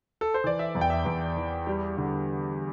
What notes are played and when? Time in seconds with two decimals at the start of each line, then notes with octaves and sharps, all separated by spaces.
0.21 A4
0.34 C5
0.44 E3 D5
0.59 E5
0.75 E2
0.81 G5
0.90 E5
1.05 E2
1.36 E3
1.67 G3
1.97 D3